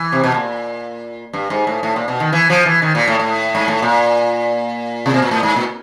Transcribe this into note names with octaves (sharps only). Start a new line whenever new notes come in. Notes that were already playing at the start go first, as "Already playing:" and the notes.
Already playing: E3
C3
B2
A#2
G2
G#2
A2
A2
A#2
B2
D#3
E3
F3
E3
D#3
A#2
A2
A2
G#2
A2
A#2
C3
B2
A#2
A2
G#2
A#2